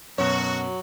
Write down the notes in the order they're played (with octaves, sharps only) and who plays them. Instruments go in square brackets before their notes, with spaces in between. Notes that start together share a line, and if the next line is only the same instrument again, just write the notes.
[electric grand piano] F#2 B2 [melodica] F#3 [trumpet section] F#4 [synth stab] C#5